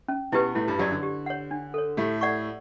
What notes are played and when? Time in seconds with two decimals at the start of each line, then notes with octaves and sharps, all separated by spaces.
0.08 C#4
0.32 B2 B3 E4 G4 B4
0.55 A2 A3 E4
0.68 G2 G3
0.79 F#2 F#3 G4 D5
0.91 D3
1.03 G4
1.26 C#5 F#5
1.51 D4
1.74 A4 C#5
1.97 A2 A3 G4
2.21 D5 F#5 C#6